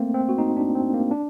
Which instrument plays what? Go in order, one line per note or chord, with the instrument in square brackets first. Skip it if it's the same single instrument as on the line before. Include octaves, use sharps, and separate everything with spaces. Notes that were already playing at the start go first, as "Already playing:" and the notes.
Already playing: [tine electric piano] A3 A#3 C4
C4
F#4
D#4
D4
C4
A#3
D4